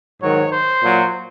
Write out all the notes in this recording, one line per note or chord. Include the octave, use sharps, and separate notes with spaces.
G#2 D#3 F#3 C#5
C5
A#2 F#3